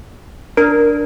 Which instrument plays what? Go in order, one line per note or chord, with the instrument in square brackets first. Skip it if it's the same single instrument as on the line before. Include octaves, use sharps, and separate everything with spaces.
[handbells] D4 [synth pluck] A#4